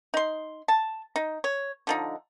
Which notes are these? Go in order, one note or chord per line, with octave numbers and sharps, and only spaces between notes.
D#4 C6
A5
D#4
C#5
D3 F3 D#4